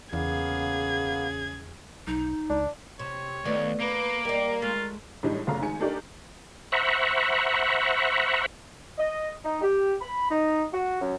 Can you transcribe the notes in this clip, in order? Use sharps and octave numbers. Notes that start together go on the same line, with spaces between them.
E2 C#3 A#3 B3 G#4 F5 G#6
B1 D#4
C#2 D4
C3 C#5
D#2 A3 B3 D5
A#3 B4 D6
G3 A#4 D5
G#3 A3 F4
A2 E3 G3 G#3 D4 D#4
F1 B1 C#3 A3 F5 A#5
D#3 G#3 G#5 C#7
A3 D4 D#4 G4 A#4 D5
C5 E5 F#5 A#5 B5 C#6
D#5
D#4
G4
B5
D#4
F#4
F#2